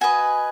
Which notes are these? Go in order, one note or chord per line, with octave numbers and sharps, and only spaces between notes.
F#4 B4 D#5 G#5